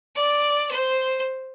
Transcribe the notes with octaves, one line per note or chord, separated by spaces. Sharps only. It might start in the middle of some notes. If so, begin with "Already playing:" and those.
D5
C5